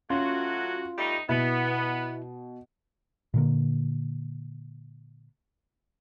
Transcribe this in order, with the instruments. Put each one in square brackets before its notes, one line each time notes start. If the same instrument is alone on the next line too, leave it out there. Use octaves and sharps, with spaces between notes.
[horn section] F#3 A3 F#4 [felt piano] C#4 [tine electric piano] F4
[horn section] G3 A3 D#4
[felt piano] B2 [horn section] B3 [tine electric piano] E4
[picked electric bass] A#2 D3 A#3